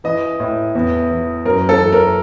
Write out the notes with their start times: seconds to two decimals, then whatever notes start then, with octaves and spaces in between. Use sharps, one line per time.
0.04 E3 D#5
0.40 A2
0.75 E2
1.11 E3
1.45 F#2 A#4
1.69 A4
1.80 E3
1.93 A#4